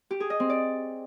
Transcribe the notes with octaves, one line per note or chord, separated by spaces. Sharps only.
G4
G#4
D#5
C4
D5